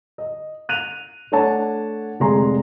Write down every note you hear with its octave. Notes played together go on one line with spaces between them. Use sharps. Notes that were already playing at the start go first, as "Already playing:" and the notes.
D#5
F#6 D#7 F7
A3 D4 C#5 F#5 A5
F1 G#3 G#4 A#5 C6